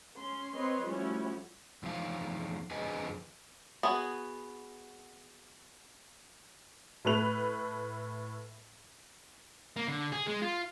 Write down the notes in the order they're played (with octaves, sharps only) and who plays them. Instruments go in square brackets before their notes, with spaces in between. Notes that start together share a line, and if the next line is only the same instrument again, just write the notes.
[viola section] C#4 C6
C4 B4 C#5 D#5 C6
F3 G3 A3 C#4 E4 F#4
[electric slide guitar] E2 F3 D#4 F5
F2 D3 G#4 B4 D#5 G#5
[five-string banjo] B3 F#4 G#4
[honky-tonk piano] A2 A3 B4 F7
[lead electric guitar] A#3
D3
G#4
G#3
F4